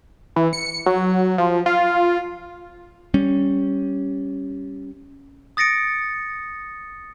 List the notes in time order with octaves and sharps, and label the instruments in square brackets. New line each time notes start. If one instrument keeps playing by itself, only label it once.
[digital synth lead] E3
C#7
F#3
F3
F4
[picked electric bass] G3 C#4
[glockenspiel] D#6 A6 A#6 C#7 D7